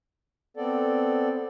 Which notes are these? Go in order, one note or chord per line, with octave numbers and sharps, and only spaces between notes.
B3 C4 A4 D5